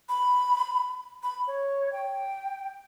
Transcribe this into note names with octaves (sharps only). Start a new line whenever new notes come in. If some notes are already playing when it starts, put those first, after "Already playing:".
B5
B5
C#5
G5